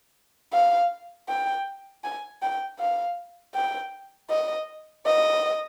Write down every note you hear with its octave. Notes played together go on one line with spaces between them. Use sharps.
F5
G5
G#5
G5
F5
G5
D#5
D#5